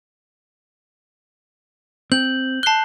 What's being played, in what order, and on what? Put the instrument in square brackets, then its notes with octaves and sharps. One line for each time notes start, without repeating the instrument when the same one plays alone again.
[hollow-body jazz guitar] C4 [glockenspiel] G6 F#7
[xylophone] A5 G7 [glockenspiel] F#6 C7